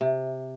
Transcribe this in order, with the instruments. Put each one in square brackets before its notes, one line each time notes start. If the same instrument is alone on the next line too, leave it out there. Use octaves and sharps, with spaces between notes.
[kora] C3